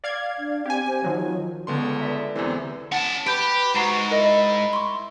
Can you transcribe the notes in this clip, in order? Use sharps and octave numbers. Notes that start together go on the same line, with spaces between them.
D5 F5 G#6
D4
C4 G4 G#5
C5
D#3 F3 F#3
C#2 D3 G#3 B3 C6
D5 E5 A#5
E2 C3 E3 C5
C#4 F#5 A5
G4 B4 G6 D7
G#2 F#4 A#5 C7 E7
E4 A#4 D#5
C6 C#6